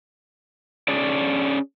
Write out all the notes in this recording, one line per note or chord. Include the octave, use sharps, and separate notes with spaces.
C#4 D4 G#4 D5